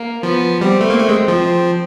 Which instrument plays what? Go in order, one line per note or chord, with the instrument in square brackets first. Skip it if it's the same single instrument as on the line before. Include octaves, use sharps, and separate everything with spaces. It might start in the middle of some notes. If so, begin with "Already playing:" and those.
Already playing: [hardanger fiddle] A#3
[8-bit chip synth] F3 [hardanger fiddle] B3
[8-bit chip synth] G3 [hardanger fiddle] C4
[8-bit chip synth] A3
A#3
A3
G#3
F3
[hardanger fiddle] C4